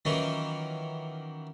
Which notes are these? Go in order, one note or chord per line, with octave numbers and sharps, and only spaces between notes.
D#3 E3 F#3 A#3 C#4 F4